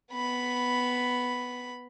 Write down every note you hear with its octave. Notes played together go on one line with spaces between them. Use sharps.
B3 B5